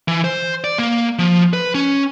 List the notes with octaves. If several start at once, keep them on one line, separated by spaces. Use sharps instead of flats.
E3
C5
D5
A#3
F3
B4
C#4